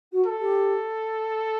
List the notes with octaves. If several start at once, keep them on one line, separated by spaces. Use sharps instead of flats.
F#4
A4
G4